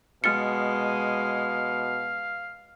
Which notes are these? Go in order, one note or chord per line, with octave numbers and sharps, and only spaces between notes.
B2 G#3 F5 F6 A6 C#7